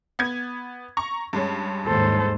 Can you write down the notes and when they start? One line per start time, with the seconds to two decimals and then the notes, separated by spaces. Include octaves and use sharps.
0.19 B3 G#6
0.97 A#5 C#6
1.33 G2 G#3 C#4
1.86 D#2 G#2 A4 C5